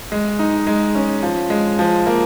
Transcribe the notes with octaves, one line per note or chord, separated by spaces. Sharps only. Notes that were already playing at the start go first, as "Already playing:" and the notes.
G#3
D#4
G#3
C#4
F3
G#3
F3
A#3